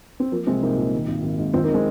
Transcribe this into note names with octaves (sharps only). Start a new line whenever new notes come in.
C4
F3 A#3
C2 G#3 C4
C2 A#3 D#4
A#2
D#3
G#1
G#1
G#2
D#2 C4 F4
A#3 D#4
D#3
G#3 C4